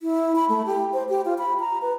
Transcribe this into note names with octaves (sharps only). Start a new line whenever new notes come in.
E4
B5
A3
G4
C5
G4
F4
B5
A#5
B4